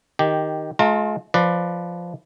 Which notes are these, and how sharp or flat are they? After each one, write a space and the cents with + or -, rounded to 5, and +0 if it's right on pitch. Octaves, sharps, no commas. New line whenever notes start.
D#3 +0 G4 +0
G#3 +45 F4 +15 A#5 -35
F3 +0 B4 +0 D5 +15